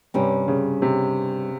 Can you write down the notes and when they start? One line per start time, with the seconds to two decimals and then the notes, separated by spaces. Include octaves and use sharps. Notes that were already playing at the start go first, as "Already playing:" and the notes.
0.14 G2 C3 G3 C#4
0.48 C#3
0.82 C3